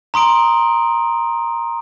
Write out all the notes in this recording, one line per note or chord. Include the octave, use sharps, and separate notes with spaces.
A#5 C6 D#6 D7